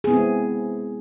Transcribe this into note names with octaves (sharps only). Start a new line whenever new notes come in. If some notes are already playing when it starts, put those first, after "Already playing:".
G#3 B3 C4 E4 G#4